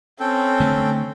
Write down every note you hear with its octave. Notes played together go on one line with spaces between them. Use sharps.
C4 C#4 A4 G5
D3 A3